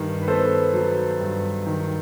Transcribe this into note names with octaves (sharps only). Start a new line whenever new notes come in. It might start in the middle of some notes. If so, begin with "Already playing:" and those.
Already playing: G2 D#3 B4
B4
B3 A4 C5
F#3
G2
D#3